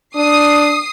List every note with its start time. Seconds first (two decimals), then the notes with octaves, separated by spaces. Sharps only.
0.16 D4 D#6 C7